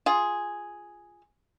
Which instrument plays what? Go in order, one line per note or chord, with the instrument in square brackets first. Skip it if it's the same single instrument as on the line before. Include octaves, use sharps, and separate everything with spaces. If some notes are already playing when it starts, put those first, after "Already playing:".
[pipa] F4 G#4